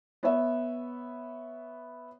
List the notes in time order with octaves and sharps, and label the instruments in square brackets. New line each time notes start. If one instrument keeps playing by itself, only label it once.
[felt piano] B3 C#5 E5